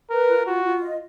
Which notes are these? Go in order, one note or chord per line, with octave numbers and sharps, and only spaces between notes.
A#4 B4
F4
F4 F#4
F4
D#5